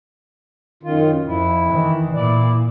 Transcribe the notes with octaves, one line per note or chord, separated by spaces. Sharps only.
F#2 D#3 F4
F2 E4
D#3 E3
A#2 E4 D5